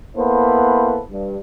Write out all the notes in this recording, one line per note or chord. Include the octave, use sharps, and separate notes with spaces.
A#3 B3 E4 A4 B4 C5
G2